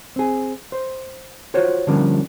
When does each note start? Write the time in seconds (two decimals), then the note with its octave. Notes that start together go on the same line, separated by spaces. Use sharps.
0.16 C4 G#4
0.72 C5
1.54 F4 F#4 C5 C#5
1.87 D3 F3 G3 A#3 C#4 D4